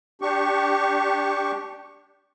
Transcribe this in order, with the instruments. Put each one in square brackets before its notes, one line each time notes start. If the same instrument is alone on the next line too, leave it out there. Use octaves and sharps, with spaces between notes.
[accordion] D4 G4 C#6